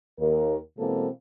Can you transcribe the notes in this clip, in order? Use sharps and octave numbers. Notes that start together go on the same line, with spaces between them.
D#2 A#4
B2 E3 G#3 A#3 C4 A4